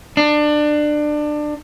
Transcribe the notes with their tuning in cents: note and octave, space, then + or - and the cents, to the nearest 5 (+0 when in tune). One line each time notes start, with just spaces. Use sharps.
D4 +25